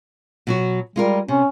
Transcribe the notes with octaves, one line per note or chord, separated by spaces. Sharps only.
B2 F#3 F#4
G3 G#3 F4 A#4
C3 C#4